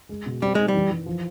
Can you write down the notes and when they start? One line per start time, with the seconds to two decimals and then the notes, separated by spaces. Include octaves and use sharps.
0.09 G#3
0.26 B2
0.42 G3 C4
0.55 G#3 D#4
0.68 G3
0.74 E3
0.90 E3
1.06 F3